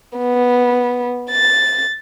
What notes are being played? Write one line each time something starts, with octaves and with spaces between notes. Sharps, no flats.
B3
A6